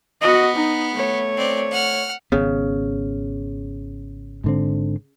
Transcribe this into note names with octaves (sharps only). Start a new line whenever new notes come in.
B3 F#4 D#5
D#4
A3 C#5
C4 D5
F#5 F6
G#1 C#3 B3
G#2 D3 C4